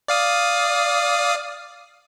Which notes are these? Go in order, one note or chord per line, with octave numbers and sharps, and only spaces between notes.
D5 F5 D#6